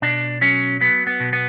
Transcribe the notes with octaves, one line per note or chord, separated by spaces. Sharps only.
B2 D4
F#3 C#4
F#3 B3
B3
B2
B3